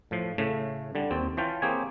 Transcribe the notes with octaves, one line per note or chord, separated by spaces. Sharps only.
A2 F3
A2 C#3 A3
D3 G3
D#2 C4
E3 C#4 F4 G5 A5
A#3 C4 G4 G#4 C#5 G#5